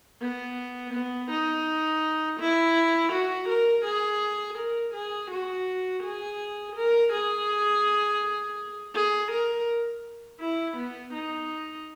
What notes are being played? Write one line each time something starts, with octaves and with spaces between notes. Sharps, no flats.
B3
B3
D#4
E4
F#4
A#4
G#4
A#4
G#4
F#4
G#4
A#4
G#4
G#4
A#4
E4
B3
D#4